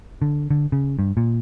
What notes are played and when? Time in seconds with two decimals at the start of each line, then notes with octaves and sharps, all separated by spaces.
0.22 D3
0.51 D3
0.72 C#3
0.99 G2
1.17 A#2